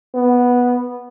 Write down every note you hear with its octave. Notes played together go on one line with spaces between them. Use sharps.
B3